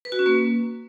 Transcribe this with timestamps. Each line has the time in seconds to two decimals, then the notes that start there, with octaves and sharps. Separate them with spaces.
0.05 B4
0.12 F#4
0.19 C#4
0.26 A#3